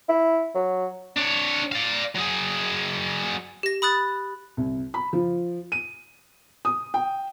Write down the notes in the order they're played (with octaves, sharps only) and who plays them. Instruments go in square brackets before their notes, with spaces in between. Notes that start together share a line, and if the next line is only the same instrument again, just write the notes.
[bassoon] E4
F#3
[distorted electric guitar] D4 C#5
D5 F5
F#3 G#4
[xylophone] G4 A#6
B5 D#6 F#6 A6
[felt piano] C2
B5
F3
D#7
D#6
G5